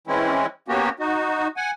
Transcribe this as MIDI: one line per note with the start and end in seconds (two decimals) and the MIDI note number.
0.07 0.46 52
0.07 0.46 56
0.07 0.46 60
0.07 0.46 61
0.07 0.46 64
0.68 0.89 58
0.68 0.89 59
0.68 0.89 61
0.68 0.89 66
0.68 0.89 67
0.99 1.48 63
0.99 1.48 66
1.57 1.71 78
1.57 1.71 80